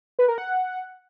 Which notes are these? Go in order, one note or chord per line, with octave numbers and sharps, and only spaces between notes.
B4
A#4
F#5